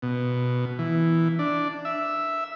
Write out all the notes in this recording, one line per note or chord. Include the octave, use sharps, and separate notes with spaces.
B2
E3
D4
E5